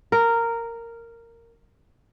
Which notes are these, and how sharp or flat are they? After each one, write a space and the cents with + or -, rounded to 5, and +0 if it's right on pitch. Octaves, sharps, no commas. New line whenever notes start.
A#4 -10